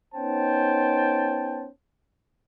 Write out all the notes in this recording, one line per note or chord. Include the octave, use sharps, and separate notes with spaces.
B3 C#4 D#4 C5 G5 A5